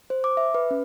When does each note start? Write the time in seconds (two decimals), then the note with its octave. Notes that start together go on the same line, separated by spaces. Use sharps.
0.10 C5
0.24 D6
0.37 E5
0.54 B4
0.71 C#4